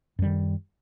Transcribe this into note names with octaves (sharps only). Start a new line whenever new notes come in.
F#2 D#3 G3